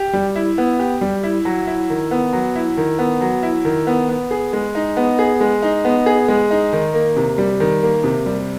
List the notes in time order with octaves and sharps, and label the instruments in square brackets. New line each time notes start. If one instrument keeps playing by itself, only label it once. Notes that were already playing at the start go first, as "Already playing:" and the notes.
Already playing: [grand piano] G4
G3
E4
B3
G4
G3
E4
F#3
E4
D#3
B3
F#3
E4
D#3
B3
F#3
E4
D#3
B3
B3
G#4
G#3
D#4
B3
G#4
G#3
D#4
B3
G#4
G#3
D#4
D#3
A#3
C3
G3
D#3
A#3
C3
G3